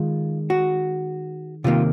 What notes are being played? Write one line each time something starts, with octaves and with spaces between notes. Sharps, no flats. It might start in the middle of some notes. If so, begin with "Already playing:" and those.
Already playing: D#3 G#3 F4
F#4
C3 D#3 A#3 F4